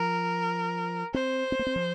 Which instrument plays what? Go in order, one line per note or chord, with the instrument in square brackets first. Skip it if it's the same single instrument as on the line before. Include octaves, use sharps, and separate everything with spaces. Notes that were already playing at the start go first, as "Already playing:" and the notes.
Already playing: [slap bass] F3 [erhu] A#4
[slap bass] C4 [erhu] C5
[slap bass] C4
A#3
C4
F3